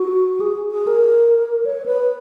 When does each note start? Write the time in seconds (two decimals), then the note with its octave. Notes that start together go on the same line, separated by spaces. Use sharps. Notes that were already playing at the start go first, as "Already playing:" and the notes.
Already playing: F#4
0.41 G#4
0.72 G#4
0.87 A#4
1.66 C#5
1.86 B4